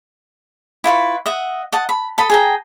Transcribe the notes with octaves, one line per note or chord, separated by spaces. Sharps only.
E4 F4 B4 C#6
D#5 E5 F#5
D#5 F#5 A5
B5
A4 D#5 B5
G#4 G5 A#5